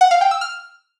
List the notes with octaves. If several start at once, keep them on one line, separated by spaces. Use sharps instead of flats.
F#5
F5
G5
E6
F6